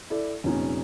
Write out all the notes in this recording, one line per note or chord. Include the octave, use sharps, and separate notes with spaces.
E4 A4 D5
F1 A#2 C#4 D#4